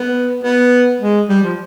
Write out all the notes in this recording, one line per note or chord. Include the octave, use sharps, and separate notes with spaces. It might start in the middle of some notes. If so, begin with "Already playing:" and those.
Already playing: B3
B3
G#3
G3
F3